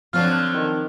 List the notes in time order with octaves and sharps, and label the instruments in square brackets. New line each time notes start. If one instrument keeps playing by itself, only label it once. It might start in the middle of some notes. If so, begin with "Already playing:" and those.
[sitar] D3 F#3 F4 [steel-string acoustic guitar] F3 C4 [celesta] F6
[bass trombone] D#3